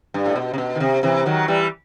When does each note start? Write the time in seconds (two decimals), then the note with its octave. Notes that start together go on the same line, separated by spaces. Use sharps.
0.14 G2
0.26 A2
0.36 B2
0.54 C3
0.58 B2
0.75 D#3
0.80 C3
1.03 C3 E3
1.26 D#3 F#3
1.48 E3 G3